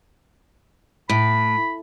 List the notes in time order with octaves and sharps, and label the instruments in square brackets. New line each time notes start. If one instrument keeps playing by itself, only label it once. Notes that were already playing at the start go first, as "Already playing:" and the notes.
[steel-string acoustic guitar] A2 [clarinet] B5